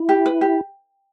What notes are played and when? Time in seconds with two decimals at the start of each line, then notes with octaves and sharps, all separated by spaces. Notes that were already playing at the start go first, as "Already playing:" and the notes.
Already playing: E4
0.09 G4
0.26 B4
0.41 G4